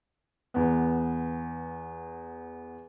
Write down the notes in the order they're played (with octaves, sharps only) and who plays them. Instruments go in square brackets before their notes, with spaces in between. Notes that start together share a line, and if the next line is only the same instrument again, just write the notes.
[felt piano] E2 B3